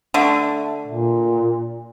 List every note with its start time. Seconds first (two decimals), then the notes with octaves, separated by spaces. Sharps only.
0.14 D3 A3
0.87 A#2